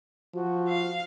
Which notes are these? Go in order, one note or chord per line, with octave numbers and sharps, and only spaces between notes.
F3 F#4
F5